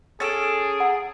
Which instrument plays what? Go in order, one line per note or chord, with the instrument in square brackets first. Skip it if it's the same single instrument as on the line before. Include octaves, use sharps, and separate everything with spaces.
[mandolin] C#4 A4 [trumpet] G#4 [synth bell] A6 D7
[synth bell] F#5